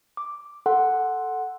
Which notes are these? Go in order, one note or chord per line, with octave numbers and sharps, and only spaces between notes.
D6
A4 F#5 C6